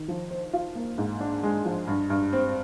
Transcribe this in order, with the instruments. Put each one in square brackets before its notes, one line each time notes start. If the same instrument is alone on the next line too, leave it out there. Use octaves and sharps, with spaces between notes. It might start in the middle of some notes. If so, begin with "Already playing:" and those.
Already playing: [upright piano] D#3
F3
C5
F4
A#3
G#2
D4
G#3
F3
G2
G2
C4